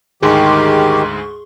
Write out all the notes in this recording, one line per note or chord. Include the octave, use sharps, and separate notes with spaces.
D2 G#2 D#3 G#3 G4 G#4 C6 C#6